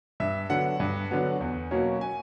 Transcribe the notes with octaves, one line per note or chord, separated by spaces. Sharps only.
G2 E5
D3 F#3 B3 F#5
G2
D3 F#3 B3
E2
B2 F#3 A#3 C#4
G#5